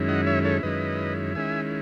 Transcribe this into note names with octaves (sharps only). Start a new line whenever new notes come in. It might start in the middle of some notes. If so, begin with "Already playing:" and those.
Already playing: F#2 D#3 G#3 C#4 E4
D#5 F#5
C#5 E5
A4 C#5
F#2 D#3 G#3 C#4 E4 B4 D#5
D#3 G#3 C#4 E4 E5 G#5